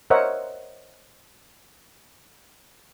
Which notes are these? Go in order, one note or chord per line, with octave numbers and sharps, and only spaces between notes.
A#4 C5 C#5 D#5 E5 F#5